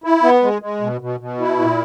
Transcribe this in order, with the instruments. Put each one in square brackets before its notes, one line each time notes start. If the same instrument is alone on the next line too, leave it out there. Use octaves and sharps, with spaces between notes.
[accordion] E4
B3
G#3
G#3
B2
B2
B2
E4
A#2